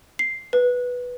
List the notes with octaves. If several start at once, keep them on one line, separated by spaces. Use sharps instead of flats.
C7
B4